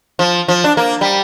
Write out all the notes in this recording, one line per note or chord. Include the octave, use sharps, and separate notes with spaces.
F3
F3
D4
A#3
G3